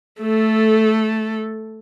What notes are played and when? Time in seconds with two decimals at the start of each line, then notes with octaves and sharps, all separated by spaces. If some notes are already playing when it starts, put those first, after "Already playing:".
0.21 A3 A4